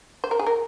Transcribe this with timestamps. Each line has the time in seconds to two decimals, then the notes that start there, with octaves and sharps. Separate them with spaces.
0.24 C5
0.31 A#4
0.39 G#4
0.47 A#4